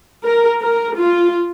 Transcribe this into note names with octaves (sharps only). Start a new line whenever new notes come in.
A#4
A#4
F4